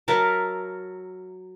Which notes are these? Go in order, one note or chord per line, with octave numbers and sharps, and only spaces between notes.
F#3 A#4 E5 A5